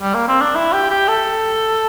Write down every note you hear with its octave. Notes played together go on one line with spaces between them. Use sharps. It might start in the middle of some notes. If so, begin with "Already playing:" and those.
G3
A#3
C4
D4
E4
G4
G4
A4